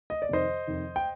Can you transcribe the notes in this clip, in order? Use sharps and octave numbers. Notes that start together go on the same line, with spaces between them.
D#5
D5
F2 C3 D#3 C5 D#5
F2 C3 D#3
G5